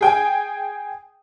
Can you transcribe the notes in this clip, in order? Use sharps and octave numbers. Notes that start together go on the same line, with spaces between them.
G#4 G5 G#5